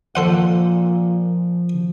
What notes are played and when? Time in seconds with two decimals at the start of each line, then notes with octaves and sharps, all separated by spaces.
0.15 A#2 F3 A4 C5 F#5